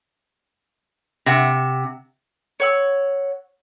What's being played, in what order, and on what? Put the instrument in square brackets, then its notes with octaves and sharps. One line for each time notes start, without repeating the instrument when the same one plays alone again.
[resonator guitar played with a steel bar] C3 F#5
[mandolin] C#5 F#5 E6